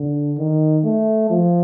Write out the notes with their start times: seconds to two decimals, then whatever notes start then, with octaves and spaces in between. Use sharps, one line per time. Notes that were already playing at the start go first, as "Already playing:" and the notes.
Already playing: D3
0.38 D#3
0.84 A3
1.30 F3